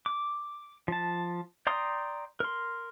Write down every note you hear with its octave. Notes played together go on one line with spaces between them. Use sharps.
D6
F3 A5
D5 G5 A#5 C6 D#6
A#4 C6